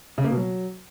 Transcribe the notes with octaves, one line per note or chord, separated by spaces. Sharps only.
C#3
A#3
B2
F#3